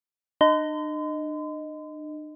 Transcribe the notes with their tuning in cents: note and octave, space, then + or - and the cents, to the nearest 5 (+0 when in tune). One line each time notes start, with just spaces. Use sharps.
D4 +45 D#5 +0 C6 -40